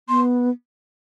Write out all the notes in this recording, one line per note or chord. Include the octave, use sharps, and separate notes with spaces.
B3 C6